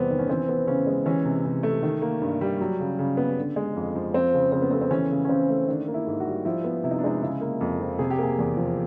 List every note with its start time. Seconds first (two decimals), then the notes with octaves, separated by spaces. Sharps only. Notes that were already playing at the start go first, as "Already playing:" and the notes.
Already playing: E2 C3 G3 B3 C4
0.10 D#3
0.19 C#4
0.29 E3 C4
0.49 B3
0.67 C#3 C#4
0.87 G#3
1.06 E3 C#4
1.25 C3
1.45 C3
1.63 A3
1.83 D#3
2.02 A#3
2.22 G2
2.41 G3
2.61 F#3
2.80 C#3
2.99 C#3
3.17 B3
3.38 D3
3.56 G#3
3.76 F2
3.95 F3
4.14 F3 C4
4.34 C#3
4.52 C#3 C4
4.62 B3
4.71 A3 C4
4.81 C4
4.91 E3 C#4
5.11 C#3
5.25 C#4
5.29 C#3 C4
5.49 A3
5.68 D#3 D4
5.88 A#3
5.94 E4
6.07 G#2
6.20 F#4
6.26 G3
6.45 F3 E4
6.64 B3
6.84 C3 E4
6.91 D#4
6.99 D4
7.04 G#3 D#4
7.22 C#3 E4
7.41 A#3
7.60 F2 A4
7.80 F3
7.99 C3 G#4
8.10 G4
8.18 A#3 G#4
8.39 E2
8.57 F3